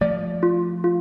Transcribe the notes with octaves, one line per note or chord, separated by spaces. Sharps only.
F3 A3 D5
F4
F4